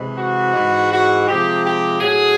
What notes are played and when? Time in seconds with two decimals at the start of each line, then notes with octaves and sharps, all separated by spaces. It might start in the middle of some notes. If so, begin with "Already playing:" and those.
Already playing: C3 E3 G#3
0.17 F#4
0.54 G#2 E3 G#3
0.91 F#4
1.27 C3 F3 G#3 G4
1.65 G4
2.01 A2 F#3 G#4